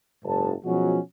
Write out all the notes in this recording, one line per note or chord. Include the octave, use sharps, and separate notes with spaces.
F#1 G#2 A5
B2 F3 F#3 G#3 C#4 F#4